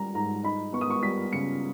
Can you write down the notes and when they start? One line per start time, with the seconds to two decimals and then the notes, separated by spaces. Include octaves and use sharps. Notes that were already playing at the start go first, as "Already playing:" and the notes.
Already playing: G3 C#4 A#5
0.15 G#2 A#5
0.44 D#4 B5
0.73 B3 C#6
0.81 D#6
0.90 C#6
1.03 G3 B6
1.33 C#3 C#7